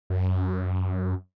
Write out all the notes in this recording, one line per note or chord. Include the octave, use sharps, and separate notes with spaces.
F#2